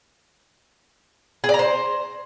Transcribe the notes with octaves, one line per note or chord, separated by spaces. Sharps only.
G#4
D5
A#5
C5